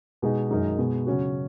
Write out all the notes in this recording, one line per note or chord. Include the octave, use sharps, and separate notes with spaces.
B2 G#3 D#4 G#4
F#2 D#3 G#3 D#4 A#4
B2 G#3 B3
C#3 F#3 C#4 F#4